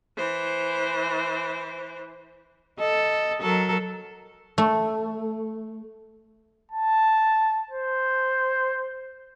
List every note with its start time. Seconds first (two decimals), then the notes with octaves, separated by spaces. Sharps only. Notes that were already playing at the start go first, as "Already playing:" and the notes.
0.17 E3 C5
2.79 A4 D#5
3.41 F#3 A4 A#4
4.58 A3
6.72 A5
7.71 C5